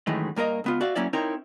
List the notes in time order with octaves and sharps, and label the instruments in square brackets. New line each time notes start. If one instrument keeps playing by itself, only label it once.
[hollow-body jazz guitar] F#2 A2 D#3 E3 G#3
G2 A#3 A#4 D#5
C#2 B3 F4
F#4 D5 E5 F5
F#3 A#3 C#4 E4 D5
C4 D#4 E4 A#4 C#5 A#5